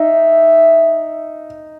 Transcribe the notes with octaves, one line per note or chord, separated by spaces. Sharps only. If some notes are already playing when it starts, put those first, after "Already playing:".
Already playing: D#4 E5